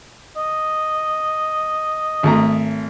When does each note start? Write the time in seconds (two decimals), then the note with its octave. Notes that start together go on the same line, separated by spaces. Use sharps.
0.36 D#5
2.23 G#1 A3 A#5